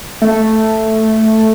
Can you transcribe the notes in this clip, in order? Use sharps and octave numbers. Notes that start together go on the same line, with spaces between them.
A3